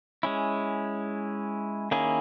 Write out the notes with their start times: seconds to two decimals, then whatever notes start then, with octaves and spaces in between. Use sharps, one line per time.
0.23 G#3 C#4 E4
1.91 D#3 A#3 C#4 E4 G#4